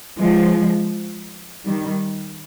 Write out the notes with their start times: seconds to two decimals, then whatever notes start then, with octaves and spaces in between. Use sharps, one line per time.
0.18 F3 G#3
1.65 D#3 G3